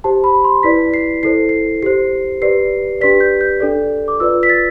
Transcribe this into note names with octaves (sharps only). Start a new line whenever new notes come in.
G4 C5 A5
B5
C6
E4 B4 D5 B6
C7
E4 A4 C5 C7
C7
G4 C5 C7
G4 B4 D5 C7
D4 G4 B4 D5 B6
G6
G6
D4 A4 D5
D6
F4 B4 D5 E6
B6
A6